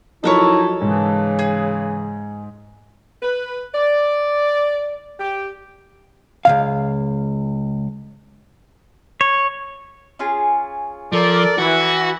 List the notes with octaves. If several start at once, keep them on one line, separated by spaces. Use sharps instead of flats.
F3 F#3 D#4 E4 F#4 A4 A#4 C#5
G#2 C#3 E3
G#4
B4
D5
G4
C#2 B2 F5
C#5
C#4 F4 G#4
F3 A4 A#4 D5
E3 F#4